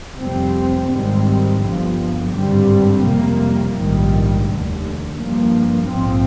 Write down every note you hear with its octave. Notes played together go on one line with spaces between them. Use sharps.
F1 F2 C3 G3 C4
G#1 G#2 D#3 G3 C4
G1 G2 D3 F3
G#1 G2 D3 G3 C4
F2 C3 G3 A#3
A#1 G#2 D#3 G3
F1 D#2 D3
G2 F3 A#3
A#1 G#2 F3 C4